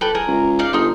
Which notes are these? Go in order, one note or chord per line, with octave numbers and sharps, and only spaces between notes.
G4 A4 B4
G#4 A#4
C#2
D#4 D5 F5
G1 D#4 C6